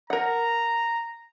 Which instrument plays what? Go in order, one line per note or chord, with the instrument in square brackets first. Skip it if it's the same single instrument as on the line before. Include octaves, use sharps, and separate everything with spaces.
[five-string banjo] A#4 F#5 [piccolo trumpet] A#5